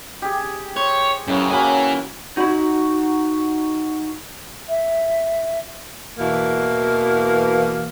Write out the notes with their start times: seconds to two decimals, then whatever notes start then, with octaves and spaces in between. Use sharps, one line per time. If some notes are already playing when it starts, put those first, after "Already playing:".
0.22 G4 G#4
0.76 C5 C#5
1.27 F#2 C#3 E3 B3
1.51 F#3 A#3 E4 B4 G#5
2.37 D#4 F#4 B5
4.69 E5
6.18 E2 B2 E3 A#3